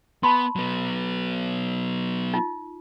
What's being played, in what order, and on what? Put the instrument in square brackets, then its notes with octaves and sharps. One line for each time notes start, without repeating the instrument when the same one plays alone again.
[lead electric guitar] B3 [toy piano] A5 B5 C6
[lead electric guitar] F#3 B3
[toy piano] D#4 F4